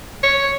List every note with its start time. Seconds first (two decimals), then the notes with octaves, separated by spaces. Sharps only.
0.23 C#5